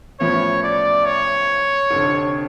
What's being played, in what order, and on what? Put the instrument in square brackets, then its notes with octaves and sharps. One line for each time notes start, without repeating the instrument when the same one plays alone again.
[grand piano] A1 A2 F3 B3 [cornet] C#5
[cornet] D5
C#5
[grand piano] F1 F2 D3